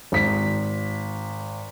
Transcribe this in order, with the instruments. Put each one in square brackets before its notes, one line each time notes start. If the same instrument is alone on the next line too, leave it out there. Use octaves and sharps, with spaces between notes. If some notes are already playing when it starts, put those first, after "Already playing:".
[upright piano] G#1 B6